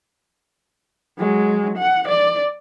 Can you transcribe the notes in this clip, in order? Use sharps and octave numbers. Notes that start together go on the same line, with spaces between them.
F#3 G#3
F#5
D5